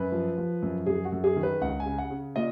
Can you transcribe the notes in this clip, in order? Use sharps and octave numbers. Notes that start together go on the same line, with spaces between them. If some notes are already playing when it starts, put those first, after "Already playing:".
Already playing: F#2 B4
F3
F3
F#2
F#2 G#4
F#4
F#2
G#4
D#3
B4
C#2 F#5
G#5
C#3
F#5
C#3
A#2 D#5